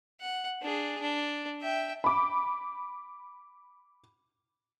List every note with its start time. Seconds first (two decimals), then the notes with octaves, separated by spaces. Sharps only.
0.21 F#5
0.62 D4 G#4
1.01 D4
1.62 E5 G5
2.04 B5 D6